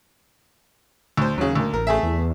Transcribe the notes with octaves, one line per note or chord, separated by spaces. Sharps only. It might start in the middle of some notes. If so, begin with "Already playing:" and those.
D2 C5
D#2 C#3 F#3
D2 A#3
A1 A#4
A3 G#4 E5
E2